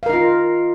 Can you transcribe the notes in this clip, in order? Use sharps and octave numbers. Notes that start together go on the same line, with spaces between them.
D#4 F4 A#4 F5